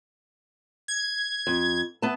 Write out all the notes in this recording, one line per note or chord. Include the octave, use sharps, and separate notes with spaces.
G#6
F2
B3 E5 A5